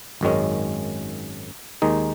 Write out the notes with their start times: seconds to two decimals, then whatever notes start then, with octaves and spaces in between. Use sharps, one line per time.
0.21 G#1 F#2 D#3 G#3 C#4
1.82 D#2 D#3 G#3 D#4